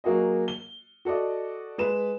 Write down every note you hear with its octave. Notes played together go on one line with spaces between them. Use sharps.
F#3 A#3 F#4 G#4 D#5
G7
F#4 A4 D5 D#5
G#3 B4 E7